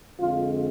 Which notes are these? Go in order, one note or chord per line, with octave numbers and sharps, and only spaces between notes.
F2 D3 G#3 C4 F4